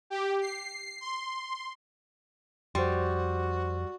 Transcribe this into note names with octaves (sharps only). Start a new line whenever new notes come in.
G4
C7
C6
F2 G3 F#4 C5 C6